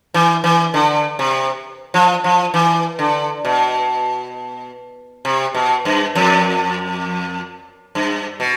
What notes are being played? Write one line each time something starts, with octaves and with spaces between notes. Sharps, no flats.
E3
E3
D3
C3
F3
F3
E3
D3
B2
C3
B2
G2
F2
G2
B2